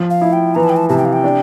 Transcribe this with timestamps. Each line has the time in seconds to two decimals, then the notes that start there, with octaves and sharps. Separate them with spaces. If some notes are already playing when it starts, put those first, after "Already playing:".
Already playing: F3
0.10 F5
0.22 E4
0.33 G5
0.55 E3 A#5
0.63 A5
0.69 G5
0.77 A5
0.89 C3 A5
0.98 G5
1.05 F5
1.13 G5
1.24 D4